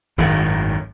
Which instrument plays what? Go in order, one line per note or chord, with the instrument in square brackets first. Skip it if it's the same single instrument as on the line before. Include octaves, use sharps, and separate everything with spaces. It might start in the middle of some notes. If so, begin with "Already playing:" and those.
[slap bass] G#1 F#2 A2 D#3